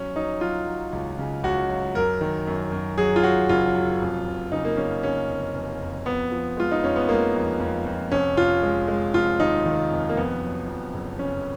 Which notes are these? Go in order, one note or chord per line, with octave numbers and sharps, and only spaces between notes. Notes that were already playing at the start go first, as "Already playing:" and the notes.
Already playing: F#3 C#4
F#3 D#4
F#3 F4
F#3
C#2
C#3
C#2 F#4
F#3
F#2 A#4
D#3
F#2
F#2
F#3 G#4
F4
F#3 F#4
F#1 F4
F#3
F1
F1
C#3 D#4
A#3
C#3 C#4
C#3 C#4
F1
F1
F2
F2 B3
F3
G#3 F4
D#4
F2 C#4
B3
G#3 A#3
F2
F2
F2
F1 C#4
F1 F4
G#3
G#3
F1 F4
D#2 D#4
D#3
F1
A#3
F2 B3
F#3
F2
F#1
C#3 C#4